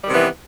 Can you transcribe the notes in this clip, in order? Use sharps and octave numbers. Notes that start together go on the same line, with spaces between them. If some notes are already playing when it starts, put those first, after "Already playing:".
C3 D#3 E3 G3 B3